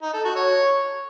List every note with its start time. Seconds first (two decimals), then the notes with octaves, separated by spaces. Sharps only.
0.03 D#4
0.14 A4
0.25 F#4
0.36 C#5